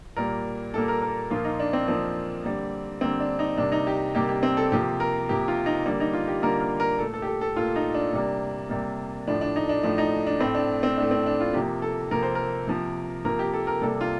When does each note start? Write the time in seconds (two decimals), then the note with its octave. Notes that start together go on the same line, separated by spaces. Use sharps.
0.16 A#2 G3 A#3 A#4
0.74 A#2 G3 A#3 A4
0.88 A#4
1.02 A#4
1.30 A#2 F3 A#3 F4
1.45 D#4
1.60 D4
1.73 C4
1.88 A#2 F3 A#3 C4
2.44 D3 G3 A#3
3.01 D3 G3 A#3 C4
3.20 D4
3.39 D#4
3.57 C3 G3 A#3 D4
3.72 D#4
3.87 G4
4.15 C3 G3 A#3 G4
4.29 G4
4.43 C4
4.57 A4
4.72 C3 F3 A#3 G4
5.00 A#4
5.29 C3 F3 A#3 G4
5.48 F4
5.66 D#4
5.86 D3 G3 A#3
6.00 D#4
6.13 F4
6.28 G4
6.42 D3 G3 A#3 A#4
6.61 A#4
6.80 A#4
6.99 A#2 A3 A4
7.14 A4
7.22 G4
7.27 A4
7.41 A4
7.56 A#2 A3 F4
7.76 D#4
7.94 D4
8.13 C3 G3 A#3
8.69 C3 G3 A#3
9.27 A2 F3 A3 D4
9.41 D4
9.56 D#4
9.69 D4
9.83 A2 F3 A3 D4
9.98 D#4
10.26 D4
10.40 A2 A3 C4
10.55 D4
10.83 C4
10.97 A2 A3 D4
11.11 C4
11.26 D4
11.40 F4
11.54 C3 F3 A#3 G4
11.82 A4
12.11 C3 F3 A#3 A#4
12.23 C5
12.35 A#4
12.68 C3 F3 A#3
13.24 C3 F3 A#3 A#4
13.39 G4
13.53 A4
13.67 A#4
13.82 C3 G3 A#3 A4
14.01 F4